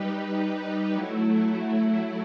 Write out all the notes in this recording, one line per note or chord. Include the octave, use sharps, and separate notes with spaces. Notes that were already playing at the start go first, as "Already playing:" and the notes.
Already playing: G3 D#4 G4 B4
F#3 A3 E4